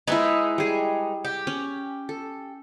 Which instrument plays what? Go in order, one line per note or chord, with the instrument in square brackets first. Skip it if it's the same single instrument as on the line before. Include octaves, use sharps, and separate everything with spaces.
[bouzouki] G#3 D#4 B4 [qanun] E4 E5 A5
[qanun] G3 G#4
[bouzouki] G4
[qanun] C#4
A4